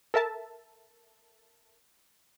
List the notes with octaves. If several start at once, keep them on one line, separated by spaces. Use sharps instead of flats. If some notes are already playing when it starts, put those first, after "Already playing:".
A4 A#4 E5 A5